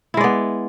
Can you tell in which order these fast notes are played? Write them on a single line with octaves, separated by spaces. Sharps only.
E4 G#3 D5 B3